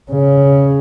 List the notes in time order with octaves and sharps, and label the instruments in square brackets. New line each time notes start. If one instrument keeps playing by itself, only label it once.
[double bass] C#3